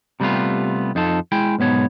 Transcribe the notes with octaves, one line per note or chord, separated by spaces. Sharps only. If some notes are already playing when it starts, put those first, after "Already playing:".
C3 G3 A3 B3 F4
F2 D#4 F4 A4
G#3 E4 G5
B1 G#2 B3 C#5